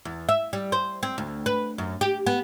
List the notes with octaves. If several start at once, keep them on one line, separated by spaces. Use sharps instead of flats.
E2
E5
G3
C5
C4
D2
B4
F#2
G4
B3